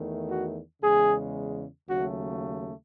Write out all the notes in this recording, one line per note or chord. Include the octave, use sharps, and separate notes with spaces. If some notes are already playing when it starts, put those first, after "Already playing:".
Already playing: E2 D#3 A3
F#4
E2 C#3 G#3 G#4
D#2 C#3 F#3 A3 F#4